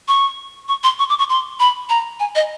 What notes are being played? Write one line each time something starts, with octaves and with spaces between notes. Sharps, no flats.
C#6
C#6
C6
C#6
D6
C#6
C6
B5
A#5
G#5
D#5